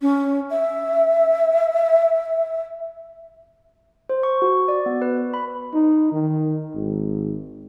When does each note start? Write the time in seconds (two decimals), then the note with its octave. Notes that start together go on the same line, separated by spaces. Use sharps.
0.01 C#4
0.50 E5
4.09 C5
4.23 C#6
4.42 F#4
4.68 D5
4.86 B3
5.02 B4
5.17 B4
5.34 B5
5.73 D#4
6.12 D#3
6.74 G#1